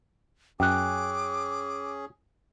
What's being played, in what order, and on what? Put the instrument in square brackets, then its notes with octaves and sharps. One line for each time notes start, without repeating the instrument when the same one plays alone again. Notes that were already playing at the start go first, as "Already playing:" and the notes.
[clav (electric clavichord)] F#2 [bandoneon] C#4 G#4 [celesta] G5 F#6 [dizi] D6